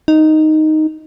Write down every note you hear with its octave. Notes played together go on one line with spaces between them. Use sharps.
D#4